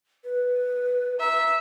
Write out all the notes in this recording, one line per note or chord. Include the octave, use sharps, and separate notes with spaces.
B4
E5 A#5